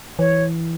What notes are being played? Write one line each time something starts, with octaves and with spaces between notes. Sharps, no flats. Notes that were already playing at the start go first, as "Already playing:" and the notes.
E3 C#5